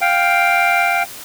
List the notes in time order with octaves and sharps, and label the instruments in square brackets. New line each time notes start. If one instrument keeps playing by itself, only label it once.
[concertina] F5 G5